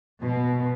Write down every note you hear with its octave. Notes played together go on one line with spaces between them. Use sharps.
B2